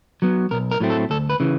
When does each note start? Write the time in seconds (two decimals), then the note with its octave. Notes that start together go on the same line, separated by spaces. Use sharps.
0.22 F#3 B3
0.51 B1 A#4
0.71 A#4
0.80 A2 F#3 A3 C4
0.90 A4
1.10 D2 A4
1.30 B4
1.40 C#3 E3